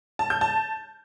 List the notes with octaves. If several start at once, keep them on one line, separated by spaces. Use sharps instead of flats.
A5
G6
A5